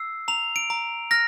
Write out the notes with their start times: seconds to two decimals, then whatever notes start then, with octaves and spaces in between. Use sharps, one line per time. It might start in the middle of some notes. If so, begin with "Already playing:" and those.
Already playing: E6 C7
0.28 A#5 F7
0.56 D7
0.70 A#5
1.11 F6 A#6